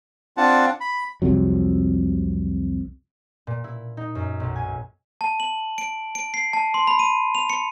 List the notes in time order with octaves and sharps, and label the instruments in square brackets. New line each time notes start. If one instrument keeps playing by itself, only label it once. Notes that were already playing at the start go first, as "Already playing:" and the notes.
[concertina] C4 D4 F4 F#5 A5
B5
[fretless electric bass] C2 F2 C3 F#3
[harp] A#2
E4
D#4
F#2
B1
G#5
[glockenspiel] A5
F#7
D7
D7
C7
A5
C6
B5
D#7
F7
C#7